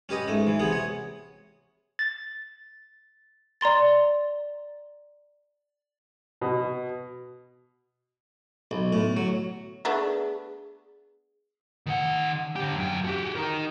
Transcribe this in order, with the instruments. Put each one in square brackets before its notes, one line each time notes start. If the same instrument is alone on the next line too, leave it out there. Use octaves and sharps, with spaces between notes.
[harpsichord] C#4 G4 B4 D#5
G#2 A3
E3
C3 B3 G#4
C#5
[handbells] A6
[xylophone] D5 A#5 C6 A6
[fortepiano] B2
[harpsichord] B1
A2
F#3
[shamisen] A3 B3 D4 [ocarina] G#4
[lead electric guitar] D#3 F#5
D3 G4
F#2 G5
F#4 G4
D#4 A#4